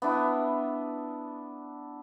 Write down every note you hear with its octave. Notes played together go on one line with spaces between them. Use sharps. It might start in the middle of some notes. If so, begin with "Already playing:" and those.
B3 D4 E4